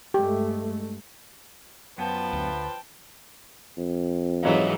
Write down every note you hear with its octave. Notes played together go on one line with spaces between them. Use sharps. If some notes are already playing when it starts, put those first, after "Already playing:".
G2 G#3 A3 G4
F#2 F3 B3 B4 G5 A5
D2
F2
G#2 E3 F#3 C#5 D#5 F5